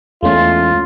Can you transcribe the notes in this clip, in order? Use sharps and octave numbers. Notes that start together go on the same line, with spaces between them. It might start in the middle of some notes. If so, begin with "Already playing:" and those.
E2 G#3 A3 C#4 F4